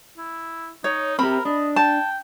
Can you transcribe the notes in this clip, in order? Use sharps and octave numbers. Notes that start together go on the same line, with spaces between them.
E4
D#4 C#5
C4 G4 A#4 B5
D4 D#5
G5 A5